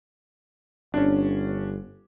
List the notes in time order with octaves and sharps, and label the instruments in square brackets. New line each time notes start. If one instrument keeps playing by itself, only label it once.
[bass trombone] G1 [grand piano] C#4 D4